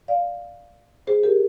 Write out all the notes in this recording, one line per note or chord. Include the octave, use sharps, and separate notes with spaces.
D5 F5
G#4 C5
G4 A#4